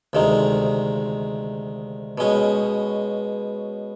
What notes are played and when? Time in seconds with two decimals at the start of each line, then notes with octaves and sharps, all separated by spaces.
0.13 D2 C3 D#3 G#3
2.18 B2 G#3 C#4